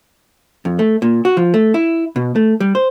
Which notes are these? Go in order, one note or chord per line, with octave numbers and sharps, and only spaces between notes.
F2
A3
A#2
F#4
F3
A3
E4
B2
A3
G3
C5